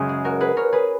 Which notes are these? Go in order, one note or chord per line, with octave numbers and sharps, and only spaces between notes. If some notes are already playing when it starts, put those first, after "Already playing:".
Already playing: F#2 C#3 G#3
G#4
F#4 A#4
G#4 B4
A#4 C#5
G#4 B4